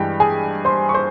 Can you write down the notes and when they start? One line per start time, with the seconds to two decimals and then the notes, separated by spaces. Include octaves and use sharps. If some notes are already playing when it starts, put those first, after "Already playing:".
Already playing: G2 E3 G#3 G4 G5
0.20 G#4 G#5
0.65 C5 C6
0.89 C#6
0.94 C5 C6